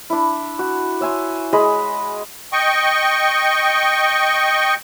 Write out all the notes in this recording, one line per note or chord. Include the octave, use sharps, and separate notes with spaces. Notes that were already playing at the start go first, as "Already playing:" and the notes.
D4 E4
F#4
C#5 E5 G#5 C6
G#3 G#4 D#5 B5
D#5 G5 C#6